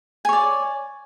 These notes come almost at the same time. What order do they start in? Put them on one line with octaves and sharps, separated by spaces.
G#5 C#5 D5